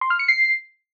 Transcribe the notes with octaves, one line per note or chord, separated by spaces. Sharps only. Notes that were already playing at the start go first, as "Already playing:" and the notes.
C6
F6
C#7
C7